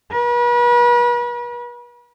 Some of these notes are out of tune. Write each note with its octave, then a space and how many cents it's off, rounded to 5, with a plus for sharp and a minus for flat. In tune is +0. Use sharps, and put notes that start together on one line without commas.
B4 -40